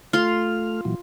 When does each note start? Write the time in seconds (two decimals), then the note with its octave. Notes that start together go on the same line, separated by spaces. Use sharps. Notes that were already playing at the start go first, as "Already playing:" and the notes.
0.13 A3 F4 C6 F6
0.85 A#2 E3 F#3